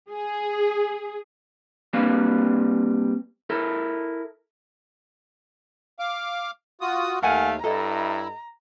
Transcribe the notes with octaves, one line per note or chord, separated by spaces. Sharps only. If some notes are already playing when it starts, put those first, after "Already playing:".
G#4
G3 A#3 C4 D4 B4 F5
E4 A4 A#4
F5 D6
F4 F#4 D#6
D#2 A3 A#4 F5 F#5 G#5
G2 E4 A4 D#5 A#5